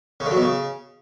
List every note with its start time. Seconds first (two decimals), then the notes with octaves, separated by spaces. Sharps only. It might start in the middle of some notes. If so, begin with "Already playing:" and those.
0.20 C#3
0.26 D3
0.31 F#3
0.36 B2
0.42 C#3